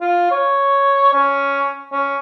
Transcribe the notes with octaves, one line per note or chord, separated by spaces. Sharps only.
F4
C#5
C#4
C#4